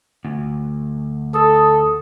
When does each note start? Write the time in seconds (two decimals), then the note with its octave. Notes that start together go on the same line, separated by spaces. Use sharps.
0.25 D2
1.34 A4 D#6